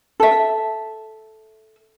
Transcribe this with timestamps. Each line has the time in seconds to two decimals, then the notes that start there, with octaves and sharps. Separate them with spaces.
0.20 A4 E5